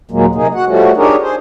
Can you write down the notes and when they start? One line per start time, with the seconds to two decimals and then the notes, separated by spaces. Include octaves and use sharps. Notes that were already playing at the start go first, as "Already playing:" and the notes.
0.11 D#2 A#2 F#3 G#3 A#3
0.35 C3 A#3 D#4 G#4
0.55 F#4 F#5
0.66 F3 G3 A3 C#4 F#4
0.97 D4 D#4 G4 G#4 A#4 C#5
1.22 G#4 C5